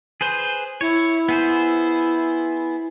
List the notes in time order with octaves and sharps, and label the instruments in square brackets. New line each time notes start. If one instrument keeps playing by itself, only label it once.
[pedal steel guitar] G#4 B4 C5
[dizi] E4 [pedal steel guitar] C#5
[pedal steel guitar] B3 G#4 C5